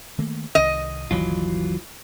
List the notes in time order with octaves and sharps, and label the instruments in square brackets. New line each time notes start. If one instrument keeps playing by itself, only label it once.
[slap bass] D#3 A3 A#3
[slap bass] C2 C3 D#3 [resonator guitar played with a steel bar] D#5
[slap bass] G1 D#2 B2 [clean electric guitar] E3 F#3 F4